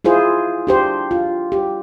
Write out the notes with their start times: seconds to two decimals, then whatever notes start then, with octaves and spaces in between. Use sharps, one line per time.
0.05 E4 F4 G#4 C5
0.67 D4 G4 C5
1.11 F4
1.52 G4